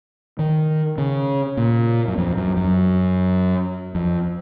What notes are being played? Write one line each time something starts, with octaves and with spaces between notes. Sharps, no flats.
D#3
C#3
A#2
F#2
F2
F#2
F#2
F2